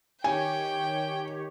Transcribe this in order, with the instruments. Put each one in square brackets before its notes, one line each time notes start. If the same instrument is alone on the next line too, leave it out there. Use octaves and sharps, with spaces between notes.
[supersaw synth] D#3 G4 C#5 [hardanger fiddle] G5 [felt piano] G#5